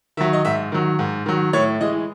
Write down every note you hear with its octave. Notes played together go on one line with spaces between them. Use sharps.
D#3 F#3 E5
D#5
G#2 E5
D#3 F#3
G#2
D#3 F#3
A2 C#5
E3 G#3 D#5